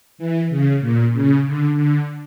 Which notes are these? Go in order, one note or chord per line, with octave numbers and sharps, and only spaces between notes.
E3
C#3
A#2
C#3
D3
D3